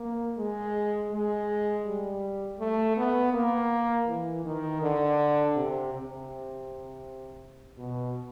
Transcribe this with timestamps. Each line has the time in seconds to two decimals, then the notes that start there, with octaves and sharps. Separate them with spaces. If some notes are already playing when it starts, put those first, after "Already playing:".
Already playing: A#3
0.38 G#3
1.12 G#3
1.86 G3
2.59 A3
2.97 B3
3.33 A#3
4.08 E3
4.45 D#3
4.82 D3
5.56 C3
5.93 C3
7.78 B2